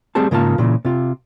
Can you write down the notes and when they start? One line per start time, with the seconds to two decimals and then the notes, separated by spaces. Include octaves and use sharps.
0.15 G3 A3 C4 G#4 C5 A5
0.31 G#2 C#3 A#3 F4 A5
0.58 A#2 C#3 E3
0.85 C3 F4